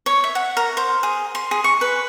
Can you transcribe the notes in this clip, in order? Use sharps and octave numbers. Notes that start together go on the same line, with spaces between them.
C#5
E5
F#5
A#4
C5
G#4
C6
G#4
C#6
B4